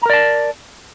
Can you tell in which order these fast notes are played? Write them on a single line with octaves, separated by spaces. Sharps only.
A#5 A#4 D5 A5